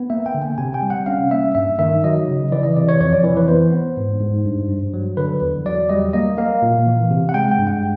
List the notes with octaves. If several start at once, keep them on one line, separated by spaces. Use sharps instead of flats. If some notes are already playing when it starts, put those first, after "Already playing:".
Already playing: B3
A#3 E5
G5
D3
G#5
C3 G#5
G5
G3
F#5
C#4 F5
A#3 E5
G2 E5
D#3 E5
F#3 D#5
C#3
E3 D5
D#5
C3 D5
C#5
F2 C#5
D5
E3 C#5
B4
B3 C5
B3
G#2
G#2
G2
G2
F#3
D3 B4
E2
F#3 D5
G3 D#5
A#3 D#5
A#3 F5
A#2
E3
C3
F#5
G#3 G5
G5
G2
F#5